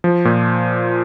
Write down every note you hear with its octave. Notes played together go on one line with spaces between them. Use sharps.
F3
A#2